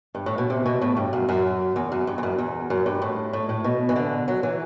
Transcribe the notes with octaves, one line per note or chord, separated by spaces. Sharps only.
G2
A2
B2
C3
B2
A2
G2
F#2
F#2
E2
F#2
G2
E2
F#2
E2
F#2
G2
A2
A2
A2
B2
E3
D3
F#3
E3